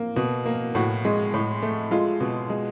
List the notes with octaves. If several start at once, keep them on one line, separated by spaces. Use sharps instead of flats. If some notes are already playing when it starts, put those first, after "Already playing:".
Already playing: A#3
B2
A#3
A2 F#4
G#3
A2
A3
G#3 F4
B2
G#3